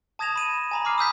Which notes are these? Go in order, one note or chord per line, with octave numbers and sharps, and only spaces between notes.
A5 D#6 G#6 A#6 E7 F7
B5 D#7 E7
G#5 A#5 B5
B5 D6 F6 C7 F7
D#6 E6 G6 B6